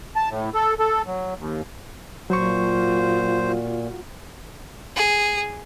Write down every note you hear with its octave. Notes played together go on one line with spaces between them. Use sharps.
A5
A2
A4
A4
F#3
D#2
A#2 F#3 F4 F#4 C5 C#6
G#4